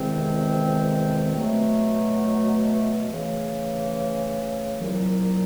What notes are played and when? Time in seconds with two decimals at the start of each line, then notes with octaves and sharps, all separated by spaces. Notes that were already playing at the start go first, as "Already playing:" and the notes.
Already playing: E2 C3 D#3 G#3 C4
1.35 B2 F#3 A3
3.07 C#3 E3 A3
4.79 C2 A#2 F#3